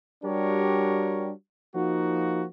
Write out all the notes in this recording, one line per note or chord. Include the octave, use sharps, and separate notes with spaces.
G3 D4 F#4 G4 A#4 C#5
F3 A#3 D#4 F#4